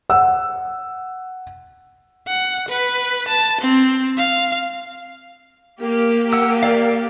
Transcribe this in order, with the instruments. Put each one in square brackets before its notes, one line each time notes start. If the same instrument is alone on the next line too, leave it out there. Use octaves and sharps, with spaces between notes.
[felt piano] F#5 E6
[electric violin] F#5
B4
A5
C4
F5
[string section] A#3 G4
[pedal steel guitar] F#5 E6
A#4 D5 F5